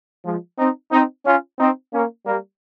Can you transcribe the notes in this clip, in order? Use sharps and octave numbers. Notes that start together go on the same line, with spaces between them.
F3 G#3
C4 D#4
C4 D#4
C#4 F4
C4 D#4
A#3 C#4
G3 A#3